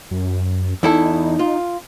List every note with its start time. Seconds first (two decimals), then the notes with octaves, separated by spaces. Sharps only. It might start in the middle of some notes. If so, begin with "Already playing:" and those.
0.11 F#2
0.83 E2 D#4 E4 A4
1.39 F4